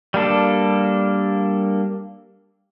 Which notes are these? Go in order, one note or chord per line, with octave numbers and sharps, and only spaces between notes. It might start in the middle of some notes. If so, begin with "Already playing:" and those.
G3 A#3 D4 A4